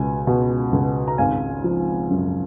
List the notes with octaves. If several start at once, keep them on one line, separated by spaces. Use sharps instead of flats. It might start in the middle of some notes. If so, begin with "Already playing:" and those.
Already playing: C#2 B2 G#5
B2
C#2
A#5
G#1 F5 G#5
F3
F#2